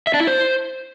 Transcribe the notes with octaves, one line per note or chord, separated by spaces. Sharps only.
E5
D4
E4
C5